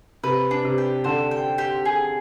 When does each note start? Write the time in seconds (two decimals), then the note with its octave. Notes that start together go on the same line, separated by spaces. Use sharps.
0.24 C3 B4
0.51 D4
0.65 C3
0.78 G4
1.04 D3 C5
1.31 G5
1.58 G4
1.85 G#4